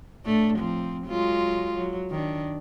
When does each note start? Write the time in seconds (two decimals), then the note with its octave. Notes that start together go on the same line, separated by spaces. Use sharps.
0.25 A2 A3 D4
0.58 F3 C4
1.07 F#3 G#3 F4
1.76 F#3
2.10 D#3 D4